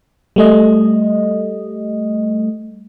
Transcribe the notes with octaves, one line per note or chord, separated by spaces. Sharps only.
G3 A3 D#5